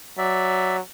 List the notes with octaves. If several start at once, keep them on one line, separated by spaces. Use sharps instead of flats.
F#3 D5 E5